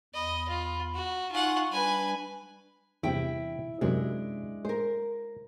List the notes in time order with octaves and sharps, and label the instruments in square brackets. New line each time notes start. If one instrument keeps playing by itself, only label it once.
[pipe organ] E2 B5 [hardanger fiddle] D#5
[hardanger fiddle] F4
F#4
[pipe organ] D#4 G#5 C#6 [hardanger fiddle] F4 F#5
[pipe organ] G3 D4 B5 [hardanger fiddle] B4 G#5
[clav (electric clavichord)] E2 G2 C3 [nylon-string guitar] E4 G5
[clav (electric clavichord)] F#2 C3 [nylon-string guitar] G#3 D4 E4
[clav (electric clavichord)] G#3 [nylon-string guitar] A#4 C5